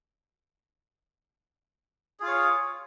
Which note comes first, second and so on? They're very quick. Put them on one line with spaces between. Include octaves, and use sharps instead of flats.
G#4 F4 F5 C#5